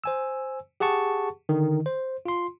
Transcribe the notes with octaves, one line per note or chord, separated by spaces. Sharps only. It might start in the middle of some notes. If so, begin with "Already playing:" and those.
C5 G#5 E6
G4 G#4 F#5 A5 C#6
D3 D#3
C5
F4 C6